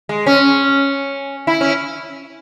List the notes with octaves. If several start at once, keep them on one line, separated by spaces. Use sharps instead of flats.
G#3
C#4
E4
C#4